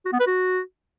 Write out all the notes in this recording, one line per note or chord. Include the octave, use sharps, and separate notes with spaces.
F#4
B3
B4
F#4